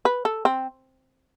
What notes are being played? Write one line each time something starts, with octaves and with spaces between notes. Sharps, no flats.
B4
A4
C4